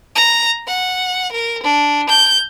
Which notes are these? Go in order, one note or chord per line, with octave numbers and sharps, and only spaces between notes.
A#5
F#5
A#4
D4
G6